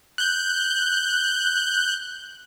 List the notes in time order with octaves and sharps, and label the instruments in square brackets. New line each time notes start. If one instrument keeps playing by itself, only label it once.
[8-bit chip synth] F#6 G6